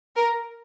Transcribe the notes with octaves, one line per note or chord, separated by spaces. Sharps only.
A#4